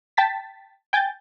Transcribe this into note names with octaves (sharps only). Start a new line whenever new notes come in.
G5 A5 A6 B6
G5 G#5 G6 A6